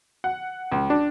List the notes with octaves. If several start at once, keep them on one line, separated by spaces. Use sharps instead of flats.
F#5
C#2
D4